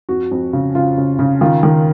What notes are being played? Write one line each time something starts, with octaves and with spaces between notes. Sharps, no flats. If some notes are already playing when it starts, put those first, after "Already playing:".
F2 F#4
F2
C#3
C#3 F4
C#3
C#3
D#3 F4
D#3